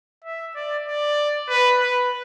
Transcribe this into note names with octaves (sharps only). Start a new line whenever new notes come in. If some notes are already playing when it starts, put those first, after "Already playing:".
E5
D5
D5
B4
B4